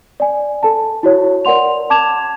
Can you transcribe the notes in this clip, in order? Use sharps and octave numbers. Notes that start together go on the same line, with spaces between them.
D5 G#5
A4 A5
E4 F#4 C#5
A#4 D5 F#5 C6 F7
A5 D6 G#6 E7 F7